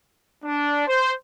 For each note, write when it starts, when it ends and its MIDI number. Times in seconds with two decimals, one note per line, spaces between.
0.44 0.87 62
0.88 1.13 72